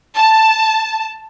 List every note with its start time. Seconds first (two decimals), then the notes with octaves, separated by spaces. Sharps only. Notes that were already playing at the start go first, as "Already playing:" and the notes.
0.16 A5